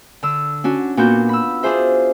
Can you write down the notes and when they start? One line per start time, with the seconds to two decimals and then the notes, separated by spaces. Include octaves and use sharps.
0.23 D3 E6
0.64 C#4 D4 F#4
0.97 A#2 B3 D4 F#4 G6
1.29 B5 E6
1.63 D4 F4 G#4 C5 E5